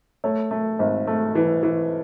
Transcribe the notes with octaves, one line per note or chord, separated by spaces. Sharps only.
A3 C#5
A3
G#1
A3
E3
E3